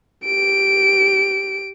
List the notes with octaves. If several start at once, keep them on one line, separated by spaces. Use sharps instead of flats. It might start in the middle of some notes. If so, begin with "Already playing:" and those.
G4 D7